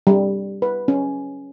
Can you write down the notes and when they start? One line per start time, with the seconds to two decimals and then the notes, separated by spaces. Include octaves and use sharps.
0.07 G3
0.62 B4
0.88 C#4